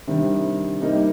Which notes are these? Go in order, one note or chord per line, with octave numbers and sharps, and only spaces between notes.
C3 D#3 G3 D4
C3 G3 A#3 D#4